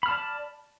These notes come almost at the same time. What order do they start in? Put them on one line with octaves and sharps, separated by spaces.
B5 F6 A5 D5